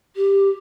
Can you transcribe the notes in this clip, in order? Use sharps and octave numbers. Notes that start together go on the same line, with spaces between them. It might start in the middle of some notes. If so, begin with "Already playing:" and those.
G4